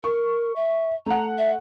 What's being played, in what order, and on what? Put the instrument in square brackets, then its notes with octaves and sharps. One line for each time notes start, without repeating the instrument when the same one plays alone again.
[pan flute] A#4 [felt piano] C#6
[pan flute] E5
[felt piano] A3 F#5 [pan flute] A#5
[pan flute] E5